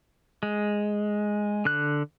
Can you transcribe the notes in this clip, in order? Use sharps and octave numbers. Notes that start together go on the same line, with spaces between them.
G#3
D3 F#6